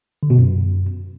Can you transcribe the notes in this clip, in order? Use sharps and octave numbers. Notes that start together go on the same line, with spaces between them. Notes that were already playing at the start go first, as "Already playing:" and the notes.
D3
B2
F#2